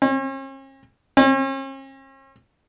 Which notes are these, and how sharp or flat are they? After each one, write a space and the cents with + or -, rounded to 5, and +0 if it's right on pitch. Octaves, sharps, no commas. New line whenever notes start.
C#4 -45
C#4 -45